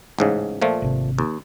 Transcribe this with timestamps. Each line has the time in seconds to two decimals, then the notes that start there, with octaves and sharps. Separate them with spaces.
0.19 A1 G#2 C#3
0.62 A#2 F3 A3
0.82 G#1 C3
1.19 D#2